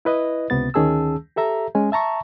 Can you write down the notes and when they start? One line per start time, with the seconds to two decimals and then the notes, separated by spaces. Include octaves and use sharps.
0.05 E4 B4 D#5
0.50 C#2 C3 B3 A6
0.74 D2 D#3 C#4 G#4 A5 E6
1.36 G4 A4 E5 A#5
1.75 G#3 C#4 G#5
1.92 E5 A5 A#5 C#6